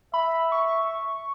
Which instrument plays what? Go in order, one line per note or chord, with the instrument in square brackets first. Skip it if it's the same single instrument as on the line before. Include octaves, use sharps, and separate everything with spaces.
[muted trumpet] E5 [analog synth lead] B5
[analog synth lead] C#6